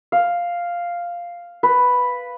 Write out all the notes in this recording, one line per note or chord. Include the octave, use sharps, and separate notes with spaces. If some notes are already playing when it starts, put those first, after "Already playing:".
F5
B4